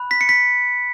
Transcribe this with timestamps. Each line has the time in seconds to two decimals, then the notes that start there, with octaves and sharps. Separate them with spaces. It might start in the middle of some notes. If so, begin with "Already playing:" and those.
Already playing: B5 F#6
0.11 B6
0.21 C#7
0.29 B6